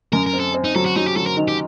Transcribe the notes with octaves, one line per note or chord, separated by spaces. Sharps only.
F#2 A#4
A#4
C4
A4
C4
D#4
F#3 A4
F#4
F#3 D#4
G4
F#3 A4
A#4
D#3
G4